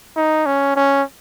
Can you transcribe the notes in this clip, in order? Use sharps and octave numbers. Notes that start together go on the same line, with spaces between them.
D#4
C#4
C#4